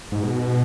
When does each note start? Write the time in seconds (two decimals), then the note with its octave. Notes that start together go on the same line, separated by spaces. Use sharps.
0.12 G#2
0.23 B2